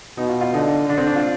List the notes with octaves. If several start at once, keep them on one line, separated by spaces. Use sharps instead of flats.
B2 D#4
F4
F4
D3 D#4
D3 D4
C4
D4
F4